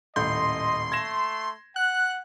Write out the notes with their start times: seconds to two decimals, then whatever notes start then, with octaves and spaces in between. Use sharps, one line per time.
0.16 D#1 A2 D#5 C6 G6
0.92 A3 G#6 A#6 E7
1.76 F#5 F#6